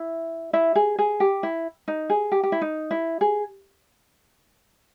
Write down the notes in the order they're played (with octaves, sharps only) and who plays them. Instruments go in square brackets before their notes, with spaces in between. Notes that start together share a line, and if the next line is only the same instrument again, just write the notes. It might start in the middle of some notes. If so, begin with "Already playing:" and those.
Already playing: [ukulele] E4 E5
E4 E5
G#4
G#4
G4
E4
D#4
G#4
G4
G4
E4
D#4
E4
G#4